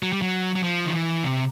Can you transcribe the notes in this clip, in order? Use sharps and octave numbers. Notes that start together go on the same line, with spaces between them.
F#3
G3
F#3
F#3
F3
D#3
E3
C3